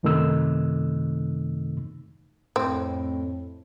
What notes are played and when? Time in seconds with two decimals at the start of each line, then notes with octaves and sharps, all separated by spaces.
0.03 F#2 C3 D#3 A3 D#4 E6
2.56 F2 A2 C4